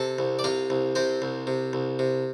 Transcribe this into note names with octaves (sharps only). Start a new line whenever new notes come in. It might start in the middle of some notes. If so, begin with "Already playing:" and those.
Already playing: C3 A4 A5
C2
D5
C3 F4 F5
C2
C3 C4 C5
C2
C3
C2
C3